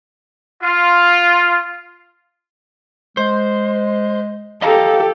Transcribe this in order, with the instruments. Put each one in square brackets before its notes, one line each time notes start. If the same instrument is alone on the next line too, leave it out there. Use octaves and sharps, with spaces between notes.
[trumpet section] F4
[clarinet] G#3 [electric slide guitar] C5
[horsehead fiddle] G4 A4 [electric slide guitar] D#5 F5 A#5